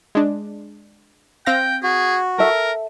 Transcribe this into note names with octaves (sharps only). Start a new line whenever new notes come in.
G#3 D4
C4 F5 G5 A#6
F#4 G#4
A4 A#4 E5